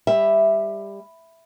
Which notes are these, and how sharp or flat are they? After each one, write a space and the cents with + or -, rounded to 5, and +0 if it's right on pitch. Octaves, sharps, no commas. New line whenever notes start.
G3 +20 E5 +0